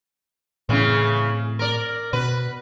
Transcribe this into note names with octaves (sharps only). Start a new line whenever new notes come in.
A2 C#3 E3 C4
A#4 D5
B2 B4